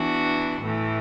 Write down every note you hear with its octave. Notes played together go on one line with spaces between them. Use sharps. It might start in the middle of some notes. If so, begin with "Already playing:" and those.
Already playing: E3 B3 D4 F#4
A2 E3 A3